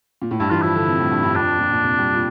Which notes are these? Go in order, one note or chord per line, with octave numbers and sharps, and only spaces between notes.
A#2
A2
G2 E4
E3 F4
F3 E4
D3
C3
A2
G2
G2
F2 D4
A#2
A#2
C3
G3
A#2